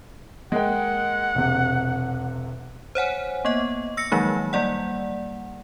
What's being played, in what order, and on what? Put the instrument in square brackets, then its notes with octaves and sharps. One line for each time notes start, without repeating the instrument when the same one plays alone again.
[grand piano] G#3 A#3 G5 [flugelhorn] F#5
[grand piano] E1 C3
[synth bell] C5 C#5 F#5 G#5
A#3 B3 D#5
E6 A#6 C#7
D#3 F3 F#3 G#3 A#3 D#4
G3 A#3 D5 F#5